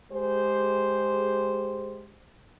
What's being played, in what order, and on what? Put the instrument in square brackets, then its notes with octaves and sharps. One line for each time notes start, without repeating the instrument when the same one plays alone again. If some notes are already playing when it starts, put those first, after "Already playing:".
[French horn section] G#3 G4 G#4 C5